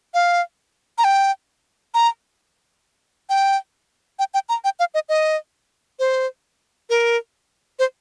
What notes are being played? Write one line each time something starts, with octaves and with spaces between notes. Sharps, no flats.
F5
A#5
G5
A#5
G5
G5
G5
A#5
G5
F5
D#5
D#5
C5
A#4
C5